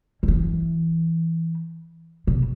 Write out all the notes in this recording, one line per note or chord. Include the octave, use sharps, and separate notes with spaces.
D#3
E3
B2